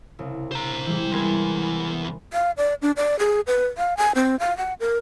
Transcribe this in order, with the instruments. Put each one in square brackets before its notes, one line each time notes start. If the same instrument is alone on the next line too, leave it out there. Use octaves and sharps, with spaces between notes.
[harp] C2 C#3
[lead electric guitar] C5 A#5
[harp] E3 G3 G#3
[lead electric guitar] E2 E4 [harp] A#4 G#5 C6
[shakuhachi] F5
D5
D4
D5
G#4
B4
F5
G#5
C4
F5
F#5
A#4